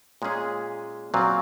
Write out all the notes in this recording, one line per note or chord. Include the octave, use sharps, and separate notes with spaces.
A#2 G#3 C#4 G#4
A#2 F#3 C4 F4